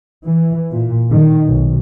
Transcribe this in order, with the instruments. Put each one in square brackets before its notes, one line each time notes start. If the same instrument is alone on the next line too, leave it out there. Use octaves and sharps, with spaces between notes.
[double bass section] E3
A#2
D#3
B1